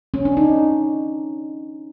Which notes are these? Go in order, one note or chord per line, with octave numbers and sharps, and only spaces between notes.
C#4
D4
D#4